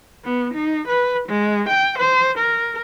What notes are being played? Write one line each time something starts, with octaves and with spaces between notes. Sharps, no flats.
B3
D#4
B4
G#3
G5
C5
A#4